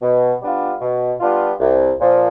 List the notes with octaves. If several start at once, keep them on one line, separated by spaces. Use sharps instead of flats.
B2
G3 B3 D4 F4
B2
G3 B3 D4 F4
C2
A#2 F3